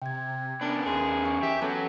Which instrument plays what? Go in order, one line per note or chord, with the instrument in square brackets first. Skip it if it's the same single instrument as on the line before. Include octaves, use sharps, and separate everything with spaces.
[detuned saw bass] C3 [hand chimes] G5 G#6
[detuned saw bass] B3 [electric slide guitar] C#4 A#4 B4 [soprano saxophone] D4
[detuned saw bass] D#2 [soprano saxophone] G#4 [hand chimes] A#5 C6 F#6
[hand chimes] G#5 C#6
[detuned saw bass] E3 [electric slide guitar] G4 [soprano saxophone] E5
[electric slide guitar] F#3 [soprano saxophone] B3 [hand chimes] C#4 A4 A5